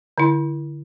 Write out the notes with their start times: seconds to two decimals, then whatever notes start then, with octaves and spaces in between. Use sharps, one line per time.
0.18 D3 E4